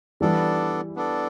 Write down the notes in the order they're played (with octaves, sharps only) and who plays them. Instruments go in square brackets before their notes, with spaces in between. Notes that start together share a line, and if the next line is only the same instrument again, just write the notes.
[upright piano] E3 G3 [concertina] B3 D4 A4 D5
[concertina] B3 D4 A4 D5